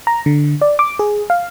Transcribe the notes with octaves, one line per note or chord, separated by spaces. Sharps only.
A#5
D3
D5
D6
G#4
F5